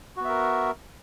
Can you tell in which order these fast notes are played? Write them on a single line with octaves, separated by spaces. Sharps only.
F#4 B3 E5 A#4